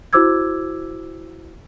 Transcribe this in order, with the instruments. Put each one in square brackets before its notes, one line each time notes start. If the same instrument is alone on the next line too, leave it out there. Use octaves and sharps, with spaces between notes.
[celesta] E4 F#4 C5 D6 E6 G#6